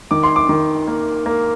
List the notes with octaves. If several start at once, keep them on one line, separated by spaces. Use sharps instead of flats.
D#3 D6
C6
D6
D#3
A#3
A#3